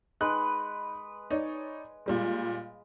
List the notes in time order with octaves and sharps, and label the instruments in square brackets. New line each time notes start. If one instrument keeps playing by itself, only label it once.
[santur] G#3 B4 [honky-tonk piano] D#4 F#6
[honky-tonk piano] D#4 C#5 D5
A#2 G3 G#3